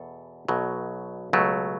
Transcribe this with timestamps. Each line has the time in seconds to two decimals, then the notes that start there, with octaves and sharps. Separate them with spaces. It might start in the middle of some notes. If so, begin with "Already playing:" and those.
Already playing: E2 B2 A4
0.48 B1 B2 F#3
1.33 C#2 B2 F#3 A3